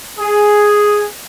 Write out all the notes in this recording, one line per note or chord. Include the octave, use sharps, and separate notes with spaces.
G#4